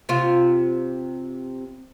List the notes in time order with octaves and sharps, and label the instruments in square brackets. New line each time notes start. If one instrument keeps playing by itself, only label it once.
[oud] C3 F4